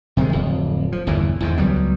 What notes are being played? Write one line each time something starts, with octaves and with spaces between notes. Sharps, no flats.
C3 D#3 G3 G#3
D1 F2
F3
G1 E2 A#2 E3
E2 G#2 D#3
C#2 F#3 G3 B3